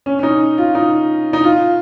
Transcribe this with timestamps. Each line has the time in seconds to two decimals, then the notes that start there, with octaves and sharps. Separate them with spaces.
0.06 C#4
0.19 C#4
0.23 D#4
0.58 F4
0.75 D#4
1.33 D#4
1.44 F4